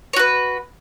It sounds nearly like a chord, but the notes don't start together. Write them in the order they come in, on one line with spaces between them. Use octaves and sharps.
C#5 F#4 B4